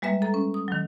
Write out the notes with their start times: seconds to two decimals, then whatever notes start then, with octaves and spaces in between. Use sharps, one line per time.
0.02 G3 G#3 A#3 B4 E5
0.22 A4 A#5
0.34 C#4
0.54 D#6
0.68 D#3 F#3